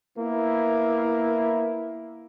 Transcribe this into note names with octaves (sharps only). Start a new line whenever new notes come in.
A#3 B3 E4